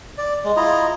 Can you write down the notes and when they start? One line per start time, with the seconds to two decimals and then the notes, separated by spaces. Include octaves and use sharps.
0.18 D5
0.44 G#3
0.57 E4 F4 D#5 A#5